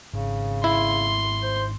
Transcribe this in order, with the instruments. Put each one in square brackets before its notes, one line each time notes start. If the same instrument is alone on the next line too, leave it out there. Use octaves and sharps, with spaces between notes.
[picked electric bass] G#1 [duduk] C#3
[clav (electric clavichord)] E4 [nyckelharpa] C6
[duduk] C5